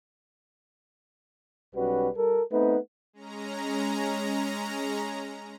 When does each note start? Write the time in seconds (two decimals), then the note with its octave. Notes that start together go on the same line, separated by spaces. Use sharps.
1.74 B1 G3 C#4 F#4 B4
2.17 G3 A4 A#4
2.51 A3 B3 C4 D#4 B4
3.13 G#3 C#4 A#5